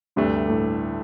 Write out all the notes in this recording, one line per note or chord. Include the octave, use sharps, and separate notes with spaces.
D2 G2 C3 A3 D4
A2